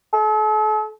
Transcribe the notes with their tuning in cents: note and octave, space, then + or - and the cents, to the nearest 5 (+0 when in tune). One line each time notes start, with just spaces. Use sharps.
A4 -40